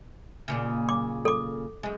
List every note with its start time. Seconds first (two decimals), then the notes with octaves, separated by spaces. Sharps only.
0.48 D#2 A#2 C#3
0.89 D6
1.25 A4 D6
1.83 F#2 G#3